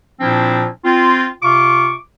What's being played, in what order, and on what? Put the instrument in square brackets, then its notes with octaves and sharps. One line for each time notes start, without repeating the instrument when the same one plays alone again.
[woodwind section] A#2 F3 C4 D4 E4
C4 F4
C3 F4 C#6 D6